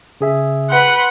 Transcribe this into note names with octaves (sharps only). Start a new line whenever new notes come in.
C#3 G#4 E5
B4 F#5 B5 C6